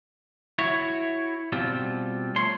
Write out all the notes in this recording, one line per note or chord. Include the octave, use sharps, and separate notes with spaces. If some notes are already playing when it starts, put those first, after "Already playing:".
E4 F#4 C#5
B2 G3 C4 F4
A3 C#5 C6